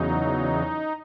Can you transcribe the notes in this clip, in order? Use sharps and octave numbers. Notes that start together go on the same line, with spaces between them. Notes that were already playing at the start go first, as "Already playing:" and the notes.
Already playing: E2 C#3 F#3 D#4